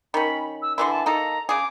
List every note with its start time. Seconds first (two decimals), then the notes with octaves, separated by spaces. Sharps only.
0.14 D#3 C#4 B5
0.62 E6
0.78 D3 E3 E4 C6
0.91 A5
1.06 A#3 D#4 A4 A#5
1.49 C#3 G#4 D6